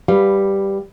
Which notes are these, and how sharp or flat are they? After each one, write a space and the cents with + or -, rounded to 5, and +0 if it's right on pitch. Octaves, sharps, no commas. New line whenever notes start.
G3 +0 B4 +0 F5 +5